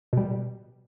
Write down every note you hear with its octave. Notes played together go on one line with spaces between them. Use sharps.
B2 G3